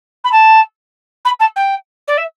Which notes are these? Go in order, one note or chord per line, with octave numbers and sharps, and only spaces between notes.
B5
A5
B5
A5
G5
D5
E5